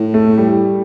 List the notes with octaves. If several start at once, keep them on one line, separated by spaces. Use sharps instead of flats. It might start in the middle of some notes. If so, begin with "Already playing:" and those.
Already playing: A2
A3
G3